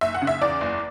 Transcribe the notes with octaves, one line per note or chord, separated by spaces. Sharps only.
F#1 E5
F#5
C#3
E5
E2 D5
F#1